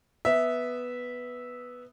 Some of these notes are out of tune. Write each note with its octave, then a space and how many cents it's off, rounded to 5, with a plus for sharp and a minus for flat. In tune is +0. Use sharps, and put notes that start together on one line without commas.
B3 +0 E5 -10